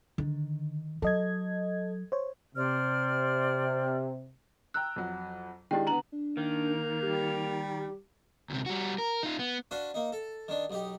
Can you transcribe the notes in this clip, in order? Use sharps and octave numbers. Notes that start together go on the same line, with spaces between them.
D3 D#3
F#3 A4 D#5 G#6
C5 C#5
C3 C5 D5 F6
G5 A#5 E6 F#6
F2 F#3
D#3 G#3 D4 E4 G4 G5
D3 B3 A#5 F#7
D4
D#3 A#3
G3 G4
D2 C3
G3 F#4
A#4
D#4 F4
B3
D4 F#4 B4 C5 F5
A#3 D#4
A4
D#3 D4
B1 D#4 G4